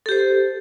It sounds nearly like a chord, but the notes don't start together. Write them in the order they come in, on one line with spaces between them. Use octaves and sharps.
A4 G4 C5